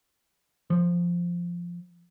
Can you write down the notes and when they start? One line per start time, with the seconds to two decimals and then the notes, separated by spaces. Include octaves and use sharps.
0.70 F3